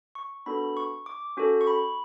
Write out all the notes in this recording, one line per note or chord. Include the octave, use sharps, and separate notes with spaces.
C#6
B3 D4 F#4 A4 B5
C#6
D6
C#4 F#4 A4
C#6
B5